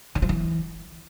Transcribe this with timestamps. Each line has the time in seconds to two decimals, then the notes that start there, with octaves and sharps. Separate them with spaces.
0.15 D#3
0.22 F3
0.29 E3